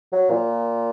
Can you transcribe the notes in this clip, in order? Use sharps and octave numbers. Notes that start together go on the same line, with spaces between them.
F#3
A#2